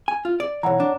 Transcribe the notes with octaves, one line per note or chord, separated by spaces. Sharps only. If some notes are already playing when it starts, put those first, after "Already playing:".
G#5
F4
D5
B1 E3 C#5 F#5 A#5
D4